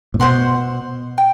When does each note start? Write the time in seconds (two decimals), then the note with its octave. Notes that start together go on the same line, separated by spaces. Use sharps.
0.14 A2
0.19 B2 C5 F#5 C6
1.18 G5